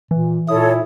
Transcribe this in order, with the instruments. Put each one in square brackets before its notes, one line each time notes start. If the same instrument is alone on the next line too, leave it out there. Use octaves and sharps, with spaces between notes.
[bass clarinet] A#2 [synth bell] E3
[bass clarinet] A#2 [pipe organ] E4 [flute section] A4 C#5 [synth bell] D#6